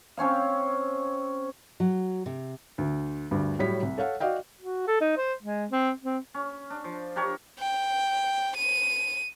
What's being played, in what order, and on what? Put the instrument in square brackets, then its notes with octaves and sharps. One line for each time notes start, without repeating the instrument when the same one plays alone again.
[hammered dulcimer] C4 C#4 C#5 F5
[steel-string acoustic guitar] F#3
C3
[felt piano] D2
D2 G2
A2 F#3 G3 C#5 B6
C2
A4 C#5 F5 F#5
F#4 D5 D#5 F5 G5
[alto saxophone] F#4
A4
D#4
C5
G#3
C4
C4
[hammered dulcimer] C#4
D4
F3
D4 G4 A#4 C#5
[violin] G5
D#7